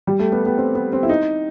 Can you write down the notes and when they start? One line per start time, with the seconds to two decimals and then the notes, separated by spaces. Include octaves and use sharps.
0.07 G3
0.19 A3
0.32 B3
0.46 B3
0.58 C4
0.75 B3
0.93 C4
1.03 E4
1.09 D#4